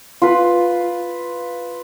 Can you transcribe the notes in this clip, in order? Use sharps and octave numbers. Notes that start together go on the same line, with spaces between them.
F4 B4